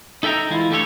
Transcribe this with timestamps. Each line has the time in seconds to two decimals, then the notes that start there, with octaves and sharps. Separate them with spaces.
0.23 D#4 A4 E5 G5 A#5
0.50 E3 G#3 E4 F4
0.70 A3 D4 G4 A4 C#5